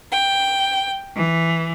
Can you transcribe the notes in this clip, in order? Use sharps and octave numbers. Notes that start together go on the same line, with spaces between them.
G5
E3